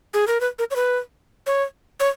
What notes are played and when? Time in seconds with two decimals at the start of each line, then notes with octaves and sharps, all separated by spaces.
0.14 G#4
0.28 A#4
0.41 B4
0.59 A#4
0.71 C#5
0.76 B4
1.47 C#5
2.00 C#5